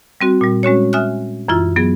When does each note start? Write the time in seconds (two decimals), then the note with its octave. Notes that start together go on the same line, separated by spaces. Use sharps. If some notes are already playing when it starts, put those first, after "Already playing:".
0.21 G3 C4 F#4
0.41 A#2 G3
0.63 G#3 C#4 F#4 C#5
0.93 E5 G#5 D#6 F6 F#6
1.48 F#2 E3 E4 F4
1.76 F#3 B3 G#4